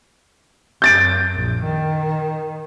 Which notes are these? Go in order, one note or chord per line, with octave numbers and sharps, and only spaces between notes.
F#2 G6 A6 D7
A#1
D#3